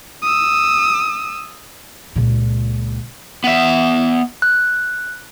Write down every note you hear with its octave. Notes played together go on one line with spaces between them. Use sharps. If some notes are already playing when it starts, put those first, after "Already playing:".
D#6 E6
C#2 A#2
B3 E5
F#6